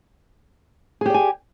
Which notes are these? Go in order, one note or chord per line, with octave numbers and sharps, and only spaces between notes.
G4 G#4 D5 G#5